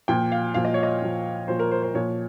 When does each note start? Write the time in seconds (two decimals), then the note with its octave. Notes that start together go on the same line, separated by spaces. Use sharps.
0.08 A#2 F3 G5
0.32 F5
0.54 A#2 F3 F5
0.65 D#5
0.74 C#5
0.83 D#5
1.02 A#2 F3
1.48 A#2 F3 C5
1.59 A#4
1.71 C5
1.83 C5
1.95 A#2 F3 C#5